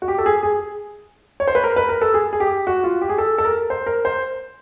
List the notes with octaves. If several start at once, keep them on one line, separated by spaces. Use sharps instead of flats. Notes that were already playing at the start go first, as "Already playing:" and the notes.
F#4
G4
A4
G#4
G#4
C#5
C5
B4
A#4
B4
A#4
A4
G#4
G#4
G4
F#4
F4
G4
G#4
A4
A4
A#4
C5
A#4
C5